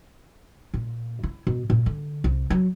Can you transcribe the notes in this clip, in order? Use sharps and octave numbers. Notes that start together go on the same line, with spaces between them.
A#2
E4
B2
A#2
D3
C2
F#3